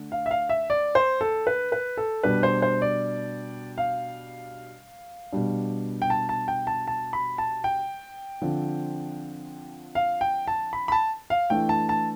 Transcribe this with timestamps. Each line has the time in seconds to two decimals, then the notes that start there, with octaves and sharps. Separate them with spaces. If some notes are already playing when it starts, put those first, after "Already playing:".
Already playing: D3 A3
0.12 F5
0.26 E5
0.31 F5
0.49 E5
0.70 D5
0.95 C5
1.21 A4
1.47 B4
1.72 B4
1.97 A4
2.23 B2 G3 D4 B4
2.43 C5
2.62 C5
2.82 D5
3.78 F5
5.32 B2 G3 D4
6.02 G5
6.10 A5
6.29 A5
6.48 G5
6.67 A5
6.88 A5
7.13 B5
7.38 A5
7.64 G5
8.42 D3 F3 C4
9.95 F5
10.21 G5
10.48 A5
10.73 B5
10.88 B5
10.92 A5
11.30 F5
11.50 E3 A3 D4 G5
11.69 A5
11.89 A5